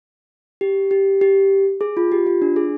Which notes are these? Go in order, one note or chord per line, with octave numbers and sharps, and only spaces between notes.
G4
G4
G4
G#4
F4
G4
F4
D4
G#4